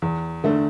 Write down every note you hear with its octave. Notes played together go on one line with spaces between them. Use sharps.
E2
D3 A3 D4